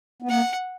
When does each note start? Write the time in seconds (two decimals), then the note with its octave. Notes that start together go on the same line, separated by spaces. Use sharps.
0.22 B3
0.29 A#3 F#5